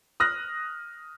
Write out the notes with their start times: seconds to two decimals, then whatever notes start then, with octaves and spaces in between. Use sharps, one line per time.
0.20 D#6 F6 F#6 A#6